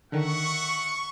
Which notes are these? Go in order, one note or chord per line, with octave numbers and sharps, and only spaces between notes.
D3 D#3 E5 F#5 C#6